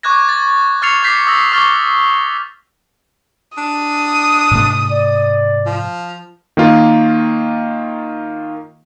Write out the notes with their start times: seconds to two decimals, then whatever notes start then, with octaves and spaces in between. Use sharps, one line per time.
0.03 C#6 D6 F#6 G#6 A#6
0.29 A6
0.82 C#6 F6 A6 C7 C#7 F7
1.03 D6 G6 A6 B6 C7
1.27 D#6 E6 A#6
1.52 C#6 D6 F6 A6 G7
3.58 D4 D#6
4.51 G#2 C3 A3
4.91 D5
5.67 F3
6.57 D#3 A#3 F4 A#4